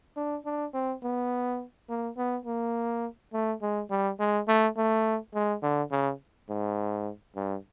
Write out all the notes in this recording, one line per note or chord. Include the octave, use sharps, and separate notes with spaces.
D4
D4
C4
B3
A#3
B3
A#3
A3
G#3
G3
G#3
A3
A3
G#3
D3
C#3
G#2
G2